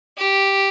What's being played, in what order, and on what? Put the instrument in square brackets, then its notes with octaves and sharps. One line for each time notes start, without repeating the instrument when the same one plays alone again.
[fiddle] G4